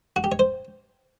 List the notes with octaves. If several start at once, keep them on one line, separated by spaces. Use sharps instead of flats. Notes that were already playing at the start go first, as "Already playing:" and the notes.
F#4
G4
C#5
C5